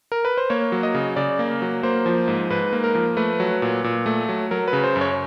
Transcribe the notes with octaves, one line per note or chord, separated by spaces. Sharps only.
A#4
B4
C5
A#3 C#5
F#3
D#5
C#3
C#3 D5
A#3
F#3
A#3 C5
F3
G#2
G#2 B4
A#3
A#4
F3
A3 B4
F#3
A#2
A#2
A3
F#3
F#3 A#4
B4
C#3
C5
F#2
C#5